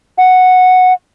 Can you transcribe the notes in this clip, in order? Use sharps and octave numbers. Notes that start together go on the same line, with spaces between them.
F#5